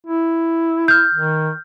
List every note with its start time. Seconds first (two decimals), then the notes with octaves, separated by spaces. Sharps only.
0.07 E4
0.88 F6 G6
1.14 D#3